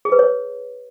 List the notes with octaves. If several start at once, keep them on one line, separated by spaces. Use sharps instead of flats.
G#4
B4
C#5